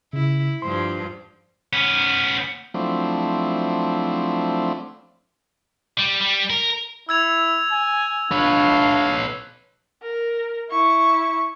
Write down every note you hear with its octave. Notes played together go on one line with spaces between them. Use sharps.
C#3 E4
G2 F3 C5 C6
B3 C#4
F3 F#3 A3 C4 D4 E4
G3
G3
A#4
E4 E6 G#6 F7
G#5
C#2 D4 B4 C#5 F5
A#4
E4 C#6